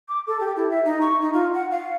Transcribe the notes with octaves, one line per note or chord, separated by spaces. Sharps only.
D6
A4
G4
E4
E5
D#4
C#6
D#4
F4
F#5
F5